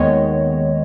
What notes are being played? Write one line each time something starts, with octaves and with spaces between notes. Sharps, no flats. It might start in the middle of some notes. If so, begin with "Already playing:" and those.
Already playing: D#2 D#3 G#3 B3 C#5 D#5